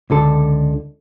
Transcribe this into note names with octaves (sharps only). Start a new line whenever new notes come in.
C#2 D3 A4